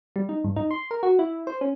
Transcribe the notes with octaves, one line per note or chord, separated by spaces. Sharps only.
G3
D#4
G2
D#4
C6
A#4
F#4
E4
C5
C#4